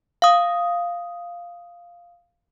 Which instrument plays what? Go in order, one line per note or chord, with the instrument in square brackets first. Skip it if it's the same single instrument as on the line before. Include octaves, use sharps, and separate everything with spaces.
[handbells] F5 D#6